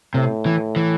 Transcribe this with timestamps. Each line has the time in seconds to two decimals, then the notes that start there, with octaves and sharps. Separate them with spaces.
0.14 A2 C3
0.46 E3
0.76 E3